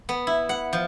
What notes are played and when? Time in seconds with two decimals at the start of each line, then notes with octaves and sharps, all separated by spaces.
0.09 B3
0.27 E4
0.49 F#5
0.73 F3